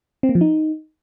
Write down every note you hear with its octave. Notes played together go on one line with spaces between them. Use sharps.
C4
A#3
F3
D#4